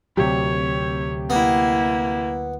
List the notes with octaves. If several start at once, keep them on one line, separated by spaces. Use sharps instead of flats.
D2 C3 F#3 G4 C#5
A#3 B3 E4